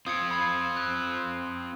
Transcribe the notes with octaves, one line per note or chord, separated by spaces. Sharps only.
C4 F4 D#6 G#6 C#7
B5 G#6
F#6